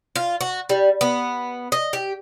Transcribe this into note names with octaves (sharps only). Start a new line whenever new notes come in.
F4
F#4
G3
B3
D#5
G4